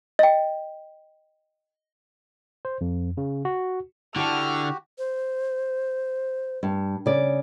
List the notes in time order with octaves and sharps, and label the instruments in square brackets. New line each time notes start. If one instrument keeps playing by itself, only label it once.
[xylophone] D#5 G5
[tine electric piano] C5
F2
C#3
F#4
[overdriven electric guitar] D3 [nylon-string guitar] E4 A5 [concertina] F#4 G4 [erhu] F6
[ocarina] C5
[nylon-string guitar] G2
C#3 D5